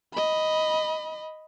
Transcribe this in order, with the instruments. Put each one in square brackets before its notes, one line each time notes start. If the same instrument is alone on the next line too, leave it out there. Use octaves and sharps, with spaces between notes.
[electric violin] D#5 B5